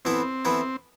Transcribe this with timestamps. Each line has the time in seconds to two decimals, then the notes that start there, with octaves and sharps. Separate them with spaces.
0.05 E3 B3 C4 E4 A4
0.45 E3 B3 E4 A4